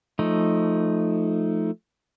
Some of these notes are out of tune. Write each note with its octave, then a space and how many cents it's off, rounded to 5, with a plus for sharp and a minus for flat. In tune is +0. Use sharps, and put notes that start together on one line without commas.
F3 +0 A3 +0 D#4 +0